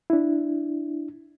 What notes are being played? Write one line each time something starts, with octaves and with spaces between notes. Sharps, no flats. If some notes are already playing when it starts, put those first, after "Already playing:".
D4 E4